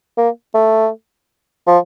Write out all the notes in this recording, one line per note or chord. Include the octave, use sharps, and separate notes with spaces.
A#3
A3
F3